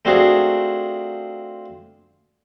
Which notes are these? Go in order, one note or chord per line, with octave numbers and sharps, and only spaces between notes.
A3 C4 D4 F4 F#4 G#4